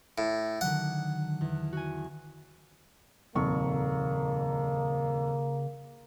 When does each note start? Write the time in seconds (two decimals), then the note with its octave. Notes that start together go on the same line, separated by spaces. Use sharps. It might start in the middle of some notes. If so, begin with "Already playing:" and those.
0.18 A2
0.61 D3 D#3 F#3 F#5
1.41 E2
1.73 F#4 G#5
3.35 D#1 F2 C#3 A#3 C#6